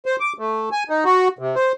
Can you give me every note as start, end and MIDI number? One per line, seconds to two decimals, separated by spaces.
0.06 0.16 72
0.20 0.33 86
0.39 0.69 57
0.72 0.84 80
0.90 1.04 63
1.05 1.28 66
1.39 1.55 48
1.55 1.72 72